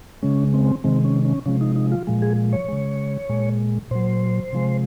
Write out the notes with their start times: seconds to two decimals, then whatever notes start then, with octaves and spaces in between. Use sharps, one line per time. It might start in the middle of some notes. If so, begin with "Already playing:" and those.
0.22 C#3 G#3 C#4
0.54 C4
0.84 C3 D#3 G#3 C4
1.05 C#4
1.25 C#4
1.46 C3 F3 G#3 C#4
1.61 D#4
1.76 D#4
1.92 F4
2.07 A#2 F3 G#3
2.22 G#4
2.53 C#5
2.68 C#3 G#3
3.29 A#2 G#3
3.91 A#2 F#3 C5
4.53 C3 F3 G#3